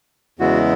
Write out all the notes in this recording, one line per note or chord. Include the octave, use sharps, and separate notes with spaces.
E2 C#3 G#3 B3 E4 F#4